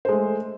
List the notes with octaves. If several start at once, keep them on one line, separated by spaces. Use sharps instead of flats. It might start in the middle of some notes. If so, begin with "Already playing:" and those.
G#3 A3 C5